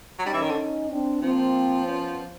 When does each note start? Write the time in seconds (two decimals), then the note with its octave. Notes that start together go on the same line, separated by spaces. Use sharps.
0.19 F#3
0.25 G3 C#4 D#4
0.33 E3
0.41 D#3
0.49 D3
0.90 C4 D4
1.21 F3 A#3 C4
1.86 B3 C#4